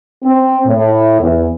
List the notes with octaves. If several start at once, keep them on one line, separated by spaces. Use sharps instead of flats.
C4
A2
E2